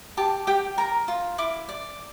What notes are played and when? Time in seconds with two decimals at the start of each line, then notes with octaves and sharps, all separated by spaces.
0.17 G4 A5
0.47 G4 G5
0.78 A#4 A#5
1.08 F4
1.38 E4 D6
1.69 D5